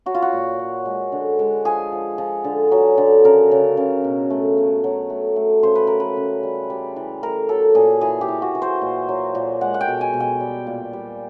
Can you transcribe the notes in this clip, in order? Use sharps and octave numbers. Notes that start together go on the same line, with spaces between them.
F#3 F#4
F4
F#4
A#2
F#3
G#3
D3
G#3
F3 G#4
F3
F3
D3
F#3
D3
C#3 A#4
C#3
C#3
B2
A3
B2
F#3
A3
A3
C#3 C5
B4
A3 A#4
B4
C#3
G3
G3
E3
A3 A#4
F#3 A4
A#2 G#4
E3 G#4
G4
E3
F#4
E3
C5
A#2
F#3
A#2
G#3 F#5
F#5
G5
B2
G#5
B2
G5
G3
A#2
G3